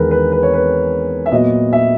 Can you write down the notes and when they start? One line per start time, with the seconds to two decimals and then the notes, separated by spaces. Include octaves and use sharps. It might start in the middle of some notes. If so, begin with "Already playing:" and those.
Already playing: E2 D#3 G#3 B3 A#4 B4
0.11 B4
0.32 B4
0.43 C#5
0.53 B4
1.26 E5
1.32 A#2 F#3 B3 D#5
1.73 E5